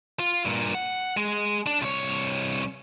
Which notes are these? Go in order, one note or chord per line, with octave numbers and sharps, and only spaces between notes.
F4
G2 A#2
F#5
G#3
D4
C2 C#5